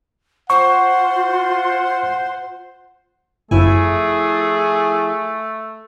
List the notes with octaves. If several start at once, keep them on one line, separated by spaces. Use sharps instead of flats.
F4 C5 F#5 C#6
G1 F#2 F3 A3 E4 G#4 G#5